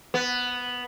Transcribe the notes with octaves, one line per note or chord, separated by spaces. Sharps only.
B3